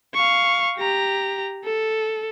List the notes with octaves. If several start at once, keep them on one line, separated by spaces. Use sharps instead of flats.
F5 C#6
G4 A#5
A4